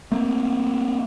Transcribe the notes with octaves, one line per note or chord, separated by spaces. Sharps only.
A3 A#3 C4